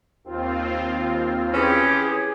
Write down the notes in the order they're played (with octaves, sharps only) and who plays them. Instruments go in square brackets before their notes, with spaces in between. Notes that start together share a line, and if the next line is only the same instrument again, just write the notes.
[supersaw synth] D#2 C4 F4
[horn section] E3 C#4 G4 [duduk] G#4